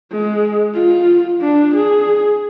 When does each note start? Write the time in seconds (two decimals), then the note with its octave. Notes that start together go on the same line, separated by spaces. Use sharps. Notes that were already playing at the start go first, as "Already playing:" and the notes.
0.12 G#3
0.75 F4
1.41 D4
1.74 G#4